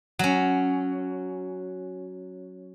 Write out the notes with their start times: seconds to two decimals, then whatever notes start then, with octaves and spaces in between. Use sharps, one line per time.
0.19 F#3 C#4